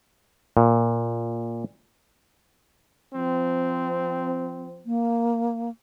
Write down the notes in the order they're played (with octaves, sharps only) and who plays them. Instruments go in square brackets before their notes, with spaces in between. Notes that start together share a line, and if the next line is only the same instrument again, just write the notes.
[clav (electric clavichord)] A#2
[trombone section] F3 C4
[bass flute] A#3